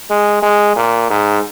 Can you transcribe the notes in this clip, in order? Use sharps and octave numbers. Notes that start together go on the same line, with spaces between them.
G#3
G#3
A#2
G#2